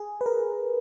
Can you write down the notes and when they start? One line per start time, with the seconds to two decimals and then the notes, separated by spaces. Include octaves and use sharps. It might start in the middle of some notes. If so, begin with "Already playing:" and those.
Already playing: G#4
0.21 B4
0.26 A#4